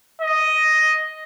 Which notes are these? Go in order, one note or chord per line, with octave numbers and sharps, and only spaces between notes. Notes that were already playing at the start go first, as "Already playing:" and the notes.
D#5